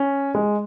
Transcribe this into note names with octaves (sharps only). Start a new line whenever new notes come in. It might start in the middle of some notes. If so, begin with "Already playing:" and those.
Already playing: C#4
G#3